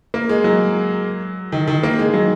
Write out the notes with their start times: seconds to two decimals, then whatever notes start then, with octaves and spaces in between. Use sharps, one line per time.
0.14 A#3
0.29 G#3
0.44 F#3
1.52 D#3
1.68 D#3
1.83 A#3
1.99 G#3
2.14 F#3